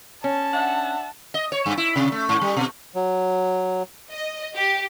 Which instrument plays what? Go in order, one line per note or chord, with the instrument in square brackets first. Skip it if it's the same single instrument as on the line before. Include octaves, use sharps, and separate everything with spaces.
[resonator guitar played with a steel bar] C#4 [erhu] A5
[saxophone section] D4 E5 F#5
[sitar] D#5
C#5
G2
E4
C3
A3
G#2
G3
B2
[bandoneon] F#3
[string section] D#5
G4